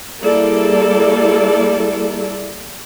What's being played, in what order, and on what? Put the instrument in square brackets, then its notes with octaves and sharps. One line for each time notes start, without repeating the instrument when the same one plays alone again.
[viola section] G3 A#3 E4 G#4 A4 D5